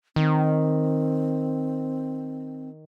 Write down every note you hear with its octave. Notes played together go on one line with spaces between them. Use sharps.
D#3 C4